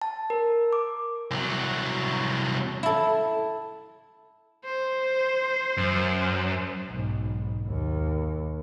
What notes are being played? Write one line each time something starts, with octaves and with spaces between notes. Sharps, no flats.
A5
A#4
D6
C2 F#3
E4 A4
C5
F#2
B1 G#2
D#2